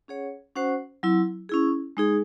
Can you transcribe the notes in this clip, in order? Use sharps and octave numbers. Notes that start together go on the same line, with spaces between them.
C#4 G#4 C#5 F#5
C#4 F#4 C5 F#5
F#3 C4 E4
C#4 E4 G#4
G#3 D#4 G#4